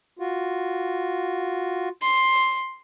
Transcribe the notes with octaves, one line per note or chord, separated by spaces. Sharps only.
F4 F#4
C6